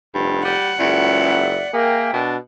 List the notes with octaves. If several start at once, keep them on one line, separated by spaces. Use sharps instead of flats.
F1 G2
G3 F#5
F#1 C#2 D5 E5
A#3 G#4 A#4 E5 G5
B2 D4